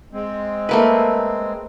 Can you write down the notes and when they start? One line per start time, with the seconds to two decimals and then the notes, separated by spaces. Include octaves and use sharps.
0.12 G#3 C4
0.69 A3 A#3 B4